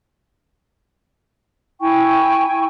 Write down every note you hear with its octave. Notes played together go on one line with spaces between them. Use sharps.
E4 G5 G#5 C#6